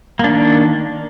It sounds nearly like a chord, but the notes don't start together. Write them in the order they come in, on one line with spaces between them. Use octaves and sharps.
A#3 D4 D#3